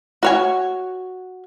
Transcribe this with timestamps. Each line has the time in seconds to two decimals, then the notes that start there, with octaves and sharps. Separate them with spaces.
0.23 F#4 C#5 G#5